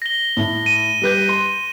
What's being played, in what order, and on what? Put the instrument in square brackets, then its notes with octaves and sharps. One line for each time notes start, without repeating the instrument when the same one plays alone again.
[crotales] A#6 G7
[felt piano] A2
[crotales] D#7
[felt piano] G3 B4 G6
C6